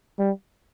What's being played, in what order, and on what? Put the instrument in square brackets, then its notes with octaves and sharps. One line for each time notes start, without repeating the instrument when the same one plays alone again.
[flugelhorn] G3